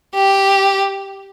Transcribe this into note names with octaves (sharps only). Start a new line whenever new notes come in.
G4